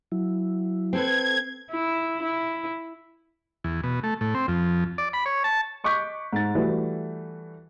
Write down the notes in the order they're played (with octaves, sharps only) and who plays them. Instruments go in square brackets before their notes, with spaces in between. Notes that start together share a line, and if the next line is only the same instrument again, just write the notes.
[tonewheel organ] F#3 E4
[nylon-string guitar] C4 A4 B4 [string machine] G#6
[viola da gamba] E4
E4
[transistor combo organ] E2
B2
A3
A2
C4
F2
D5
B5
C#5
A5
[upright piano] D#5 C#6 D6 F#6 G6 B6
G#2 A6
E3 G3 A3 E4 F#4 B4